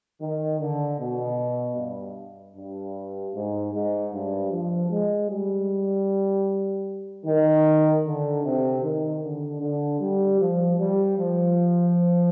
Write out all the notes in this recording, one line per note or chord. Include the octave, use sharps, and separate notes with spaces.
D#3
D3
B2
G2
G2
G#2
G#2
G2
F3
G#3
G3
D#3
D3
C3
D#3
D3
D3
G3
F3
G3
F3